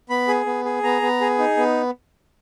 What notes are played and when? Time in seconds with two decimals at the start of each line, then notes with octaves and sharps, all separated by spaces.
0.10 B3 B5
0.28 G#4
0.46 B3
0.65 G#4
0.83 B3 A#5
1.02 B3
1.21 G#4
1.39 D#4
1.57 B3